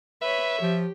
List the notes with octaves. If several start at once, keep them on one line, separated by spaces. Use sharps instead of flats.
B4 C#5 E5
F3 G4